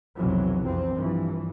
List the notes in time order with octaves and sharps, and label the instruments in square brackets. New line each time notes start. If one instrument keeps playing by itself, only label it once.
[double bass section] B1 F2 C3 E3 F#3
F2 C4
G2 E3 F3